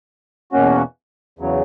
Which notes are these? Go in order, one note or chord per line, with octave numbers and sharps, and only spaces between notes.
E2 B2 A#3 C#4 F#4
E2 C#3 F#3